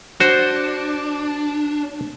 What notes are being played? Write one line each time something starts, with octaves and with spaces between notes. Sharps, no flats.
D4 F#4 C5